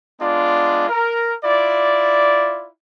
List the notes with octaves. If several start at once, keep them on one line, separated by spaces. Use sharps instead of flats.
G#3 B3 D4 F4 D5
A#4
E4 F4 D5